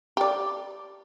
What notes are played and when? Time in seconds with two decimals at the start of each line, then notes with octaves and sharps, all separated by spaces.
0.17 G4 D5